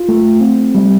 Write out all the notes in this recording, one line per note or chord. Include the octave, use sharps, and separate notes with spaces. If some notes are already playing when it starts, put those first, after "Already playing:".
Already playing: F4
A3
C4
G3